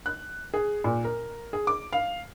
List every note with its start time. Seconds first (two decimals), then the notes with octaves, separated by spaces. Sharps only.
0.06 F#6
0.54 G#4
0.84 A#2
1.05 A#4
1.53 G#4
1.67 D6
1.93 F5